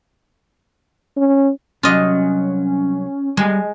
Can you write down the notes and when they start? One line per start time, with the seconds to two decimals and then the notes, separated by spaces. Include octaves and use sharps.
1.17 C#4
1.83 C2 F#3 C#4 F4 D#5
3.37 G3 G#3 G#5